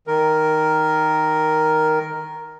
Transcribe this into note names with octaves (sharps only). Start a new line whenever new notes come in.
D#3 A#4